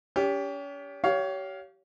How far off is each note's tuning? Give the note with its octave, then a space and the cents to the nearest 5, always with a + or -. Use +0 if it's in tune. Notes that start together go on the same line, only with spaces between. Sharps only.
C#4 +40 G4 +15
G4 -30 C#5 +20 F5 +5